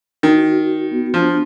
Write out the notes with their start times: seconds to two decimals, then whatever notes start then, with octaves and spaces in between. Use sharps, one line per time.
0.23 D#3 F#4
0.47 F#4
0.69 F#4
0.91 B3
1.14 F3 D4